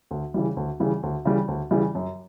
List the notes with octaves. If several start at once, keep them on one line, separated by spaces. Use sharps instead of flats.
D2
C#3 E3 G3
D2
C#3 E3 G3
D2
C#3 E3 G3
D2
C#3 E3 G3
F#2